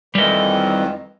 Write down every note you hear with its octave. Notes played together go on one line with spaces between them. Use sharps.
F2 D#3 E3 G3 D#5